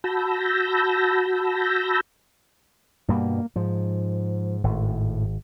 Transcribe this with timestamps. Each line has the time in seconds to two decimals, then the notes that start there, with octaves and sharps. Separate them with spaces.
0.04 F#4 A5 B5 E6 G6 A#6
3.09 G2 B2 G3 A#3
3.56 G#2 F3
4.64 G#1 A2